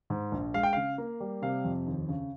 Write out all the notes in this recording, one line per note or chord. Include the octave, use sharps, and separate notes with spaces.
G#2
A#1
G#3 F5
G5
C#3 F5
A#3
G3
C3 F5
F2
D#2
C#3